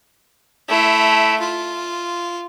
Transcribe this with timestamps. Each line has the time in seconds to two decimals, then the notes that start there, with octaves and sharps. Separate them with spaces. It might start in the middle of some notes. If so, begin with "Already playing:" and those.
0.68 A3 E4
1.40 F4